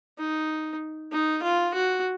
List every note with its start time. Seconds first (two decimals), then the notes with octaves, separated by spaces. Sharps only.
0.18 D#4
1.12 D#4
1.42 F4
1.74 F#4